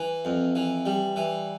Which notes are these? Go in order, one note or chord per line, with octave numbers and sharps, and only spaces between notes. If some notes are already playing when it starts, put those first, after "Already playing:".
Already playing: E3
F2
E3
G3
E3